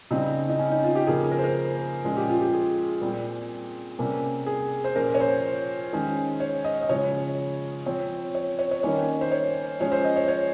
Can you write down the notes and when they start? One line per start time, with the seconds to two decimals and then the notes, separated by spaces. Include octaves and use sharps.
0.11 C#3 G3 C4 D#4
0.49 D#4
0.59 C#4
0.71 D#4
0.84 F4
0.95 G4
1.07 C#3 F3 A#3 C#4 G#4
1.32 A#4
1.38 C5
1.44 A#4
2.04 A#2 F3 G#3 C#4
2.17 G4
2.29 F4
2.41 G4
2.53 G#4
3.01 A#2 G3 C4
3.99 C3 G3 A#3 C#4
4.46 G#4
4.84 C5
4.96 A#2 F3 A#3 C#4 A#4
5.14 C#5
5.20 C5
5.93 D#3 G#3 C#4
6.40 C#5
6.64 D#5
6.82 D#5
6.89 C#3 F3 G#3 C#4 C#5
7.86 F3 C4 C#5
8.35 C#5
8.59 C#5
8.71 C#5
8.83 D#3 G3 A#3 C#4 C#5
9.21 C5
9.31 C#5
9.80 F3 G#3 C#4 C#5
9.92 C5
10.04 D#5
10.16 C#5
10.28 C#5